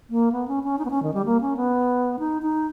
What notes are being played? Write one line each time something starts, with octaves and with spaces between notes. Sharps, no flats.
A#3
B3
C#4
C#4
D#4
B3
C#4
D#3
G3
A#3
C#4
B3
D#4
D#4